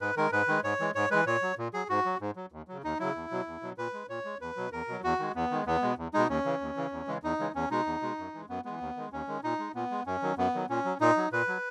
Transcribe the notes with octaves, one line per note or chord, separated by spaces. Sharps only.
G#2 B4
D#3 G#3 A#4
G#2 B4
D#3 G#3
G#2 C#5
E3 G#3
G#2 C#5
E3 G#3 B4
A#2 C#5
F#3
A#2
F#3 G#4
G#2 F#4
F#3
G#2
F#3
D#2
C#3 F#3
D#2 D#4
C#3 F#3 E4
E2
B2 F#3
E2
B2 F#3
A#2 B4
G#3
A#2 C#5
G#3
E2 B4
B2 F#3
E2 A#4
B2 F#3
E2 F#4
D#3 G#3
E2 B3
D#3 G#3
E2 B3
B2 G#3
E2
B2 G#3 D#4
D#2 C#4
C#3 E3
D#2
C#3 E3
E2
C#3 E3 G#3
E2 D#4
C#3 E3 G#3
E2 C#4
B2 G#3 D#4
E2
B2 G#3
F#2
E3 G#3
F#2 B3
E3 G#3 B3
D#2
D#3 G#3
D#2 C#4
D#3 G#3
A#2 D#4
G#3
A#2 B3
G#3
F#2 C#4
D#3 F#3
F#2 B3
D#3 F#3
A#2 C#4
F#3
A#2 D#4
F#3
A#2 B4
F#3